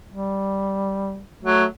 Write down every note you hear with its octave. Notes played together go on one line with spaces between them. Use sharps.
G3
F#3 A3